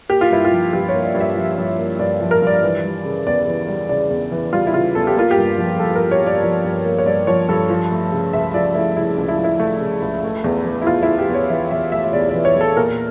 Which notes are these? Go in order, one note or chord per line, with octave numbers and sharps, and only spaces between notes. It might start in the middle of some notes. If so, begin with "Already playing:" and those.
A#3 G4
F4
G2 E4
F4
F3
G2 G4
C#5
A#3
D5
G2
E5
F3
G2
A#3
G2 D5
F3
A#4
G2 D5
E3
G3
C#3
E2 D5
E3
G3
C#3 D5
E2
E3
G3 F4
E4
C#3 F4
E2 A4
G4
A#3 F4
G4
G2
F3
G2 A4
A#4
A#3
C#5
G2 D5
F3 D5
G2
A#3
C#5
G2 D5
F3 C#5
G2 A4
F3
A3
C#3
C#2 E5
F3 D5
A3 E4
C#3 E4
C#2
E4
F3
E4
A3
C#3
C#2
A3
E2
E3
E4
E2 F4
E4
A3
G4
E2
C#5
E3 E5
E2 E5
A3 E5
E5
E2 D5
D5
E3
C#5
E2 A4
A#2 A#4